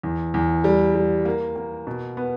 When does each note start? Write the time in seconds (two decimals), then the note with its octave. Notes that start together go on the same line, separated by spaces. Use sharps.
0.03 E2
0.34 E2
0.64 G3
0.95 G3
1.25 A#3
1.56 A#3
1.87 B2
2.17 B3